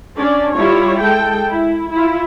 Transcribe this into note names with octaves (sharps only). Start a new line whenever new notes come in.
C#4 D4 D5
G3 E4 F4 C#5
G#3 A4 G5
E4
E4 F4